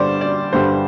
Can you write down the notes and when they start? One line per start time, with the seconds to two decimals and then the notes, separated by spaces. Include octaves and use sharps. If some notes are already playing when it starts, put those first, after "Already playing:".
Already playing: G2 D3 G3 C5 D5
0.21 D5
0.53 G2 D3 G3 C5